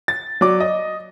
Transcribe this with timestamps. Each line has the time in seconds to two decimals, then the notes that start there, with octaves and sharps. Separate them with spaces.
0.08 A6
0.41 F#3 D5 D6
0.60 D#5